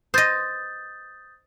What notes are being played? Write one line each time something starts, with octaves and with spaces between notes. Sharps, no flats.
C5 D#5 D#6 G6 A6